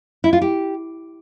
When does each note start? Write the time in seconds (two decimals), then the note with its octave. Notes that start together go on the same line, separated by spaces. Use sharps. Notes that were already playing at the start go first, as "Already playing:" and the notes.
0.24 E4
0.33 F4
0.41 G4